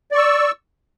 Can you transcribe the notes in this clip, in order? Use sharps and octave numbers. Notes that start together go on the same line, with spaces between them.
D5 C#6 E6